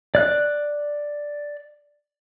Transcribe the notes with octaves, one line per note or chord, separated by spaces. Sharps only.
D5 F#6